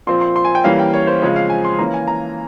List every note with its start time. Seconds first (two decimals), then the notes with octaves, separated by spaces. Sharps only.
0.07 A#2 F3 C4 C6
0.21 C6
0.36 C6
0.45 G#5
0.55 G5
0.64 E3 G3 A#3 C#4 F5
0.79 G5
0.94 C#5
1.07 C5
1.22 C#3 F3 G#3 C4 C#5
1.36 F5
1.50 G#5
1.65 C6
1.78 E3 A#3 C#4 A#5
1.94 G#5
2.07 A#5